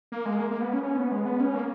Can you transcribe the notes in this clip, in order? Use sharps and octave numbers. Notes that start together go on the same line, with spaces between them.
A#3
G#3
A#3
A#3
B3
C#4
C#4
B3
G#3
B3
C#4
A#3